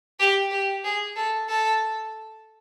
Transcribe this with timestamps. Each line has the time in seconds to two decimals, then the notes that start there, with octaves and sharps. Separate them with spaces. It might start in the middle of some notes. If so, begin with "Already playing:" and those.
0.20 G4
0.51 G4
0.84 G#4
1.16 A4
1.49 A4